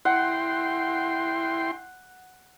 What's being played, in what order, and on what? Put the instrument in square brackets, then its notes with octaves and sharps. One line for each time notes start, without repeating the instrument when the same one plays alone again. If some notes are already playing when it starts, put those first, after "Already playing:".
[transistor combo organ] E4 G5 C6 [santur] F#5